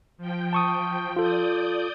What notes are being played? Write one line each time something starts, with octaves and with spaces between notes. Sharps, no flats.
F3 G5
A5 C#6 D#6
F4 A4 D5 D#6 G6